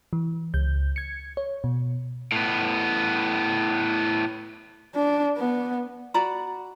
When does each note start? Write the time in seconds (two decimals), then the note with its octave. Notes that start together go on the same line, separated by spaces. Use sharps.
0.13 E3
0.54 C#2 G6
0.96 G#6 C#7
1.37 C#5
1.64 B2
2.32 A2 B3
4.95 D4
5.37 B3
6.14 F#4 D5 A#5 B5